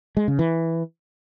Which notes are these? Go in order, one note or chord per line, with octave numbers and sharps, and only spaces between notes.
G#3
C#3
E3